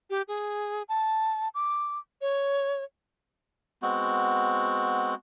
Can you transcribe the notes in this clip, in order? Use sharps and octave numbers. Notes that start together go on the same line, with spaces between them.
G4
G#4
A5
D6
C#5
G#3 B3 C4 F#4